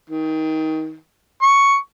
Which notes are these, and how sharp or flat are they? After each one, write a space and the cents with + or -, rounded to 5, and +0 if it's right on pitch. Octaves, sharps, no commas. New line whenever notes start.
D#3 +20
C#6 +5